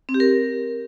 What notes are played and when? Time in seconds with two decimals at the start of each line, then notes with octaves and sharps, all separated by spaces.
0.09 C4
0.14 G4
0.20 A#4